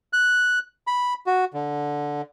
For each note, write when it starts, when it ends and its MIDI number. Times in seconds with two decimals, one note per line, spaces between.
0.13 0.59 90
0.87 1.14 83
1.27 1.45 66
1.54 2.22 50